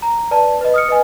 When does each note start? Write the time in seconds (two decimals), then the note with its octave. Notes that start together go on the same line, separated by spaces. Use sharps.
0.02 A#5
0.31 B4 D5 A5
0.61 B4 D#5
0.74 D#6 F6 C#7
0.89 B4 D#5 G#5